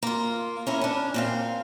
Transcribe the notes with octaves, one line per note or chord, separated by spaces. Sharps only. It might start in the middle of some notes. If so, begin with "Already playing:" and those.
A#3 F4
C#4 E4 A#4
C#4 D4
A#2 C4 F5